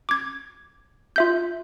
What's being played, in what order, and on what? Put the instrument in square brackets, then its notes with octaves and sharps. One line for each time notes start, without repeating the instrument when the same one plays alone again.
[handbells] D6 G#6
F4 E5 G6